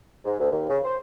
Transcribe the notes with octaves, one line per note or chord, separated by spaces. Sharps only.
G#2
D2
D#2
C#3
C5